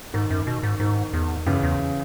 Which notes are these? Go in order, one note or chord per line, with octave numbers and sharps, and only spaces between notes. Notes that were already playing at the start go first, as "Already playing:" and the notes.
G#2 D#3
F#2
B2
G#2
G#2 D#3
E2
F#2 C#3 E3
E2